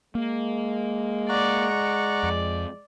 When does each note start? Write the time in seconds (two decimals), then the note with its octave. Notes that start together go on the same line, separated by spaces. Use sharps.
0.15 G#3 A#3
1.29 D5 F#5 A#5 C#6
1.71 D5
2.23 F2